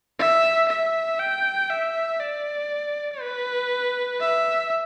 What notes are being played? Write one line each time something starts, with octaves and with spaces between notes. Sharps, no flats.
E5
E5
G5
E5
D5
B4
E5